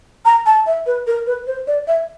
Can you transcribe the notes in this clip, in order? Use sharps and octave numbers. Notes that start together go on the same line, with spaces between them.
A#5
A5
E5
B4
A#4
B4
C5
D5
E5